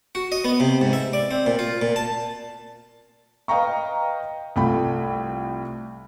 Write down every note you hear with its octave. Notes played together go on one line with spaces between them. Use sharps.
F#4
D#5
B3
C3
G#2
E5
D5
C4
A#2
F4
A#2
A5
B4 D#5 F5 G5 A#5 C#6
C2 A3 F4 G5 B5